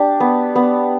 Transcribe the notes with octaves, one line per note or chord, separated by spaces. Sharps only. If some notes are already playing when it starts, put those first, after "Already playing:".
Already playing: D4 G4
B3
B3